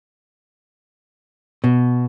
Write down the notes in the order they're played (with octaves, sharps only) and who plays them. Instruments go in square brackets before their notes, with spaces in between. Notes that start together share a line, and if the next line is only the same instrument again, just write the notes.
[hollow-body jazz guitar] B2